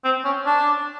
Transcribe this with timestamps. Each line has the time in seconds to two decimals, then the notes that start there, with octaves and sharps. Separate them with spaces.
0.04 C4
0.25 C#4
0.46 D4